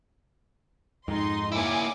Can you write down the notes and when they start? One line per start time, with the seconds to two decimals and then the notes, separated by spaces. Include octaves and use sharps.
1.08 F2 G#2 D#4 C6
1.52 A#3 E4 G#5 D6